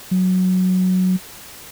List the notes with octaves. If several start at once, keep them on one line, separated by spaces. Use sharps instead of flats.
F#3